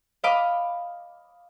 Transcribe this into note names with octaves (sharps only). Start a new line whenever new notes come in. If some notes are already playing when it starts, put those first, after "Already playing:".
D#5 F5 B5 D6